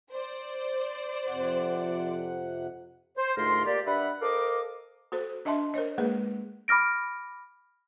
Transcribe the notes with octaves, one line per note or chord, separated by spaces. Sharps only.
C5 D5
F2 C3 F#5
C5
D2 G#2 A3 F4 A#4 C6
A#3 G4 D5
G2 D4 E5 F#5 B5
A4 A#4 C5 D#5 F5 D6
F#4 A4 C5
D4 D#5 E5 A5 C6
A#4 C5 C#5 D#5
G#3 A#3 G#4 B4
B5 D6 F6 A#6 D7